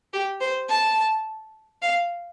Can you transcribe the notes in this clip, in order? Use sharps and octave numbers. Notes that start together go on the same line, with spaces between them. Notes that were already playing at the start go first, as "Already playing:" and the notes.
G4
C5
A5
F5